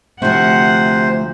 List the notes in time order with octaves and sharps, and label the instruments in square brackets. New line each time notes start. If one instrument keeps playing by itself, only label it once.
[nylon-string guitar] D2 F3 [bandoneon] C3 C5 [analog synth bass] A3 [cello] F#5